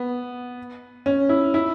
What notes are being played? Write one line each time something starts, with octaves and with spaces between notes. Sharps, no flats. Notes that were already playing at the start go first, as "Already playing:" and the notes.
Already playing: B3
C#4
E4
E4